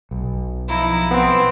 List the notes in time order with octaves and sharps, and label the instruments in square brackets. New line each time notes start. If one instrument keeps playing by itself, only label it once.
[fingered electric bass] B1
[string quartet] F3 D#4 E4
[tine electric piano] B3 [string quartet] C4 E4